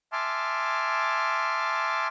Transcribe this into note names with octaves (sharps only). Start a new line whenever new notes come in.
E5 G#5 A5 C6 D6 F6